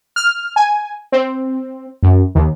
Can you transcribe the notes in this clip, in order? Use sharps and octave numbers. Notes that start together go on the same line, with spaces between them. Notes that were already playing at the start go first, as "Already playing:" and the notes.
F6
G#5
C4
F#2
D#2